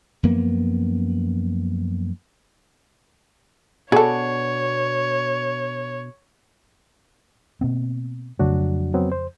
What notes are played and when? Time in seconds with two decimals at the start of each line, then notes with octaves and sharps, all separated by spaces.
0.23 F#2 F3 A#3 B3
3.92 B2 D4 F#4 G#4 A4 C#5
7.61 B2 A#3 C4
8.39 F2 C#3 F#3 A3 D4 F#4
8.94 F#3 B3 C4
9.12 C5